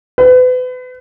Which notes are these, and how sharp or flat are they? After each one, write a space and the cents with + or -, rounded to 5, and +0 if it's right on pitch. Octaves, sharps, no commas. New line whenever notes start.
B4 +35